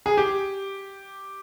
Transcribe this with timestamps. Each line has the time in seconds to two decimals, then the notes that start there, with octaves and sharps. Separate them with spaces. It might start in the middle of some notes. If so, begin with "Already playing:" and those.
0.06 G#4
0.17 G4